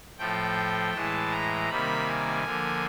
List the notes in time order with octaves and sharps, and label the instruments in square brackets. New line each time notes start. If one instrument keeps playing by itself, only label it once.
[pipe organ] A2 F3 A3 G5
A2 E3 G#3 A5
A#5
C3 D#3 G3 A#3 B5
G#5
D3 F3 A#3